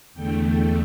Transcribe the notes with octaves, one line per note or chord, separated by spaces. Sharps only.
E2 D3 A3 G5
G5